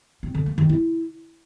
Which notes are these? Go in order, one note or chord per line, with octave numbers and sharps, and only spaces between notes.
C4
D3
A#3
D#3
E4